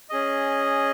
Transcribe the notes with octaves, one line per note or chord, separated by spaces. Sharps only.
C#4 G#4 D#5